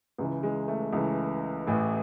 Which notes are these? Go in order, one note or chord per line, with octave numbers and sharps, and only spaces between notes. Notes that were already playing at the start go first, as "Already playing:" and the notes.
C#2 C#3 E3
G#3
A3
C#2 C#3 E3 A3
A1 A2 E3